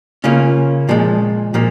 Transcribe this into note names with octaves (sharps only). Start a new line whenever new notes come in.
C#3 A#3 C#4 F4
A#2 F3 G#3
A#2 F3 A#3